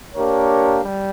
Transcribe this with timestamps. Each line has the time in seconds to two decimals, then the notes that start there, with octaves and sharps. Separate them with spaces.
0.16 A#3 D4 G4 A#4 C#5
0.82 G3